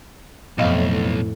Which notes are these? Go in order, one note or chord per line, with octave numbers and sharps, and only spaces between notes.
B1 F2 A2 B3 D#5 F5